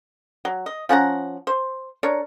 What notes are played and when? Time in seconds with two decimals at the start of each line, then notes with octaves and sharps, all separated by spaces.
0.45 F#3
0.66 D#5
0.89 F3 C#4 F#5 A#5
1.47 C5
2.03 D4 A#4 C#5